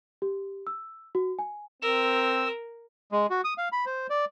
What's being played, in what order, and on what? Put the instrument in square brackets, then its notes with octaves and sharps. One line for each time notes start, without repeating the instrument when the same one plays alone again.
[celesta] G4
E6
F#4
G#5
[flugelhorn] C4 [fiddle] A#4 [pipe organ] E6
[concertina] G#3
F#4
D#6
F5
B5
C5
D5